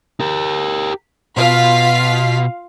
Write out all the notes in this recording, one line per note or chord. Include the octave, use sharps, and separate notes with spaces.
G4 A#4
B2 F4 F5 B6